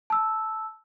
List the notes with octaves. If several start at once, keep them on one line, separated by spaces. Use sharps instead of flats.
A5 E6